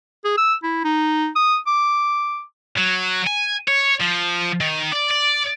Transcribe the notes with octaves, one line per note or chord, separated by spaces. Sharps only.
G#4
E6
E4
D#4
D#6
D6
F#3
G#5
C#5
F3
D#3
D5
D5